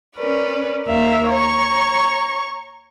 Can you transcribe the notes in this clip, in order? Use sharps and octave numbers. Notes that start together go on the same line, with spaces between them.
C#4 A#4 B4 D5
D#2 A#4 E5 F5
C#5 A#5 C#6